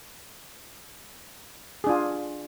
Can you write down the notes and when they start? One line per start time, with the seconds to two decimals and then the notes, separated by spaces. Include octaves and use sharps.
1.84 G#4
1.87 D4
1.89 F4